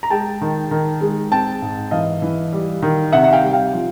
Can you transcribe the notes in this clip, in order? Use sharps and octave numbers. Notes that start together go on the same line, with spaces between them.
A#5
G#3 G5 A5
D#3
D#3
G#3
C4 G5 A5
G#2
E3 D#5 F5
E3
G3
D#3
C3 E5 F#5
F#5
F5 G5
G3
F5 G5
F3